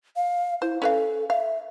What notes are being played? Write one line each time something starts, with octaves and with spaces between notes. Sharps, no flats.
F5
E4 C5
C#4 A4 B4 F5
E5 F5